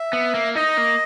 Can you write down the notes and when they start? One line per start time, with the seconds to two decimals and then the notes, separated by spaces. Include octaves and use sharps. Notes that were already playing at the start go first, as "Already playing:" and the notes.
Already playing: E5
0.13 B3
0.34 A#3
0.55 D#4 D#5
0.77 A#3